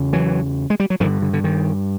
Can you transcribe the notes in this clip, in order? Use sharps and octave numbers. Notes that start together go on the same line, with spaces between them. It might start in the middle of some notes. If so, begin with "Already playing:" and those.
Already playing: E2 C#3
E3 F#3
G#3
G3
F#3
G2 D3 D#3 F3
D3
D3
D#3